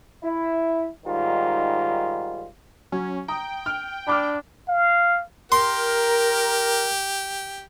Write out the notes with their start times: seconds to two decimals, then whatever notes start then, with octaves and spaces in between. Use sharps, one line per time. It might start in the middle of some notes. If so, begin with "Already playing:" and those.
0.23 E4
1.06 G#2 D#3 G3 F4
2.92 F#3 C#4
3.28 G5 A#5 D#6
3.66 F6
4.07 D4 B5 D6 F6
4.68 F5
5.52 G4 A#4 C6